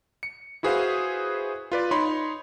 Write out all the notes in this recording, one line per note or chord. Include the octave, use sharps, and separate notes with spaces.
C#7
E4 F#4 G#4 B4 C5 F5
F4 B4 D5
D#4 C#5 B5 C6